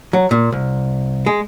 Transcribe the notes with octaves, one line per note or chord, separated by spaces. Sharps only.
F#3
A#2
C2
G#3